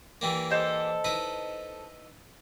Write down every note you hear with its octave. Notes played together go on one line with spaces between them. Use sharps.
E3 G3 A#3
A4 C5 D#5
D#4 E4 B4